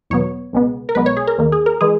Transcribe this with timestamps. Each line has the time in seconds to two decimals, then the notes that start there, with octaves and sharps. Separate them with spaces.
0.10 E2 B2 F#3 B3 C#5
0.53 C#2 B2 G#3 B3
0.89 A#4
0.95 B1 B2 G#3 B3 B4
1.06 C#5
1.17 G#4
1.27 A#4
1.38 D#2 D#3 A#3
1.52 G#4
1.66 A#4
1.81 E3 G#3 G#4